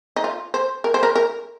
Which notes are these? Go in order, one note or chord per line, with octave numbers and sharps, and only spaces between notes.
D#4
F4
C5
A#4
C5
A#4
A#4